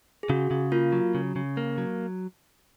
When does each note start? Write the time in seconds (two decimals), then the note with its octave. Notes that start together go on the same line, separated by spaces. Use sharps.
0.23 G#4
0.29 C#3 F#4
0.51 C#3
0.72 A#3 F4
0.92 F#3
1.15 C#3
1.36 C#3
1.57 A#3
1.78 F#3